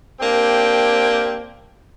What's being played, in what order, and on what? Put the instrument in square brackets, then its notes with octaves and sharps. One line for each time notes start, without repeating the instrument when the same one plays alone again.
[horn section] A#3 C4 D4 G4 G5